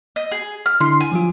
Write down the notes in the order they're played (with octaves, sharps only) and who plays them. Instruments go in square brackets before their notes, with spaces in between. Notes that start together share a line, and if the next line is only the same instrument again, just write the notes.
[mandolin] D#5
G#4
F6
[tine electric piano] D3 D4 E4 [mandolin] C6
[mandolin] G#5
[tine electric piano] F3 F#3 F4